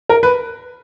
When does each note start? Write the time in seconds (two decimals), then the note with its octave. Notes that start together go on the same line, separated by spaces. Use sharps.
0.09 A#4
0.23 B4